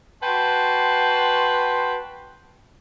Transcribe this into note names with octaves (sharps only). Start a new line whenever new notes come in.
F#4 B4 G5 A5 C6